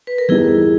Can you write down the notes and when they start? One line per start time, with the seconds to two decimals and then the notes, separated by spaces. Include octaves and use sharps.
0.07 B4
0.18 A#4
0.29 E3 G3 B3 D#4 E4 G4 G#4